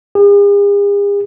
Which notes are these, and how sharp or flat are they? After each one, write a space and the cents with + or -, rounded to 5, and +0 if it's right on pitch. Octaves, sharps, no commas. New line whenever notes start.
G#4 -45